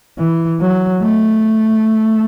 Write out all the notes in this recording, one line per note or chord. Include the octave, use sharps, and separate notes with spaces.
E3
F#3
A3